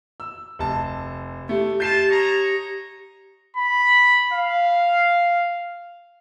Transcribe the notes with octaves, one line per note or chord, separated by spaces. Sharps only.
E6
F1 A5
A3 G4
F4 G4 A5 G6 C7 E7
C#5 D#5 A#5
B5
F5